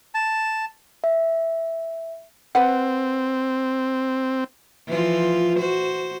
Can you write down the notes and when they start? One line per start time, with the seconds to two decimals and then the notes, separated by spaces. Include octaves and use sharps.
0.14 A5
1.04 E5
2.55 C4 B4 F#5
4.88 E3 F3 F4
5.60 F#4 C5